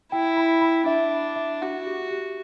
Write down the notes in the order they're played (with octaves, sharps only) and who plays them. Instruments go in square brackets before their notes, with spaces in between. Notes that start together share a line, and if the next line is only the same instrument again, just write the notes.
[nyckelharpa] E4 [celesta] G5
[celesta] B5
B5
[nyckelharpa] D4 [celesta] E5
[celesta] E5
E5
[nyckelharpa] F#4 [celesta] F#5
[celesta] G4
G4